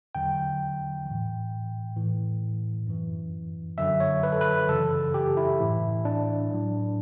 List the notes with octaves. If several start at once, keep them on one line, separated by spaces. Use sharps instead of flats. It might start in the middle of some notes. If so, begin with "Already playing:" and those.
E2 D3 F#3 G5
E3
A2
A2 E3
F#2 E3
F#2 D3 F#3 E5
C#5
B4
A4
B4
F#2 C#3 E3 A4
G4
E4
A2 E3
D4
A2 F#3